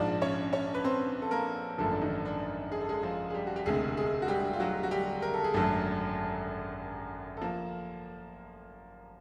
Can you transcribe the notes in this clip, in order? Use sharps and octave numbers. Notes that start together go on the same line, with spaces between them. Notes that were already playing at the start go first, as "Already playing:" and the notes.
Already playing: A#1 G#2 F3 D4 D5
C#4 C#5
C#4 C#5
B4
C4 C5
A4
A#3 A#4
G#1 F#2 D3 F3 A3 A4
D4
D#3 D#4
D4
G#4
A4
G#3 G#4
F3 F4
G#4
G3 G4
F#4
G4
E1 D2 C3 G#3 G#4
G#3 G#4
F#4
G3 G4
F4
F#3 F#4
F#4
G3 G4
A#4
A4
G#4
G#1 F#2 D3 F#3 A3 A4
A4
F3 A#3